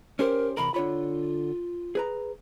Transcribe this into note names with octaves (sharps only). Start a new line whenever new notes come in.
C#4 G4 A#4 C5
E2 C3 A#4 B5
D3 F4 C#5 B5
G#4 B4 A#5